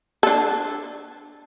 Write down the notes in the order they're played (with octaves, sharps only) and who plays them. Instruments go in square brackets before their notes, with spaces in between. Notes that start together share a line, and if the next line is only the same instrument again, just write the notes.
[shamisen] D4 A4